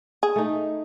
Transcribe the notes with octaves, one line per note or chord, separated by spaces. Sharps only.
G#4
A3 D#4